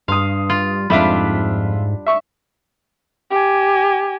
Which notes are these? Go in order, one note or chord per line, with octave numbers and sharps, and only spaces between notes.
G2 F5 C6 D#6
F4
F2 G#2 G3 D4 F4 E5 B5 B6
E5 C#6
G4 G#5